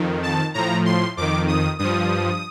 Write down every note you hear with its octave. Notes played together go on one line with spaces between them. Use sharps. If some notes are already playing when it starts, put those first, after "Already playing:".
Already playing: F2 D#3
A5
A2 F3 A#5
C6
F2 D#3 D6
D#6
G2 F3 D#6